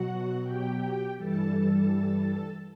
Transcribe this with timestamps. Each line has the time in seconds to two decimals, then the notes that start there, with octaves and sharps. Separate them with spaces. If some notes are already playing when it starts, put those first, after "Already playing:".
Already playing: B2 F#3 F#4 F#5
0.43 G4 G5
1.16 G2 E3 G3 A4 A5